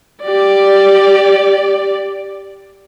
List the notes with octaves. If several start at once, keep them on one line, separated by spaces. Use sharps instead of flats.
G4 D5